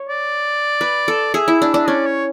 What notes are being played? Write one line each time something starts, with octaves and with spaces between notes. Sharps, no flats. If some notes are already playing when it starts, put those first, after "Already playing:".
Already playing: C#5
D5
B4
A4
G#4 E5
E4
D4
D4
C#4 D5
C#5